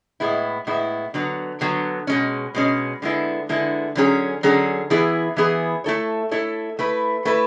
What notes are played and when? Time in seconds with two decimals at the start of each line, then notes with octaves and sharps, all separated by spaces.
0.20 A2 G#3 B3 E4
0.67 A2 G#3 B3 E4
1.14 D3 F#3 B3
1.61 D3 F#3 B3
2.07 B2 G#3 C#4
2.55 B2 G#3 C#4
3.02 D3 G#3 B3 E4
3.49 D3 G#3 B3 E4
3.95 D3 F#3 C#4 G#4
4.43 D3 F#3 C#4 G#4
4.90 E3 B3 E4 G#4
5.37 E3 B3 E4 G#4
5.84 A3 E4 A4 C#5
6.31 A3 E4 A4 C#5
6.79 A3 E4 B4
7.25 A3 E4 B4